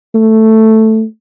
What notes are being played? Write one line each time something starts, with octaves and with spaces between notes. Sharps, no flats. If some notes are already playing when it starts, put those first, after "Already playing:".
A3